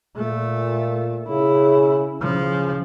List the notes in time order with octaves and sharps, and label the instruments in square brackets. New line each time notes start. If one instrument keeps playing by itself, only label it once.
[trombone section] A#2 [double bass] A3
[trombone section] C#3 [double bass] E4
[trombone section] C#3 [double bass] F3